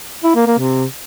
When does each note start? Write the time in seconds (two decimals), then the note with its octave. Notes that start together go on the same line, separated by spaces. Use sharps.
0.24 E4
0.35 A#3
0.46 A#3
0.58 C3